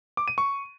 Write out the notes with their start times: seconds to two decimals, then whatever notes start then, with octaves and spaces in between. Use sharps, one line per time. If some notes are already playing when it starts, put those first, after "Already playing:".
0.17 D6
0.28 D#7
0.38 C#6